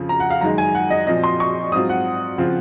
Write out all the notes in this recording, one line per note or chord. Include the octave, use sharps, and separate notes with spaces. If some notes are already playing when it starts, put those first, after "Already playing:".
Already playing: F2 C#3 F3
A#5
F#5
F5
F#2 D#3 G#3 D#4 A#5
G#5
F#5
D#5
A#2 F3 C4 D#5
C6
C#6
G#2 F#3 C4 F4 D#6
F#5
C#3 F3 C4 F4